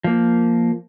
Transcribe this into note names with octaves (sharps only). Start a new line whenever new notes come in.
F3 A#3